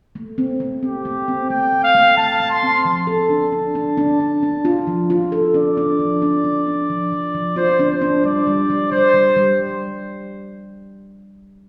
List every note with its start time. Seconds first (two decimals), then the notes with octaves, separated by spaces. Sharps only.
0.15 A3
0.38 C4
0.60 A3
0.82 C4 G4
1.05 A3
1.28 C4
1.50 A3 G5
1.73 A3
1.83 F5
1.95 A3
2.17 A3 A5
2.40 A3
2.51 C6
2.63 C4
2.85 F3 A5
3.07 A4
3.30 D4
3.52 D4
3.75 D4
3.97 D4
4.20 D4
4.43 D4
4.65 F4
4.87 F3
5.10 F4
5.32 A4
5.54 D4 D5
5.77 D4
5.99 F3
6.22 D4
6.44 D4
6.67 D4
6.90 F3
7.12 F3
7.34 F3
7.56 F4 C5
7.79 D4
7.91 C5
8.01 D4
8.24 G3 D5
8.47 G3
8.70 G3
8.91 G3 C5
9.14 G3
9.37 G3